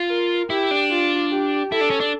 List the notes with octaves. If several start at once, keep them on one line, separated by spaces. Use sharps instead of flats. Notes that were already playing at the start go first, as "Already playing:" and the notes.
Already playing: F4
A#4
E4 G4
D4
F4
G4
E4 A4
D4
C#4
D4